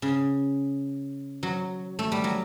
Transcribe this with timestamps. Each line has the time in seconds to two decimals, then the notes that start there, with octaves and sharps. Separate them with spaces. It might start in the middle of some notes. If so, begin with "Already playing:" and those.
0.02 C#3
1.43 F#3
1.99 A3
2.12 G3
2.24 F#3